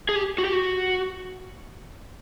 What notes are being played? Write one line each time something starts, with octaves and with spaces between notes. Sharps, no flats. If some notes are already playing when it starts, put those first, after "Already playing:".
G#4
G4
F#4
G4
F#4